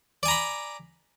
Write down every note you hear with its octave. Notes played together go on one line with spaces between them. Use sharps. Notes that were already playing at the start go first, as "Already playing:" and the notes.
D5 G#5 A#5 B5